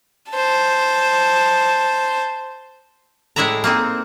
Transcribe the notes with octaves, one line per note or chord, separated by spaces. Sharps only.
C5 A5
A2 G#3 E4 D5 E5 A#5
A#3 C4 D#4